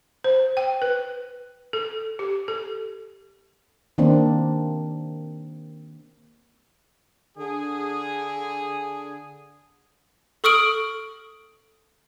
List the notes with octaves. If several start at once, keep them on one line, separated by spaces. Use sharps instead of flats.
C5
G5
B4
A4
G4
A4
D#3 A#3 C4 D4
D3 G#4
A4 C#6 D#6 F6 D7 F#7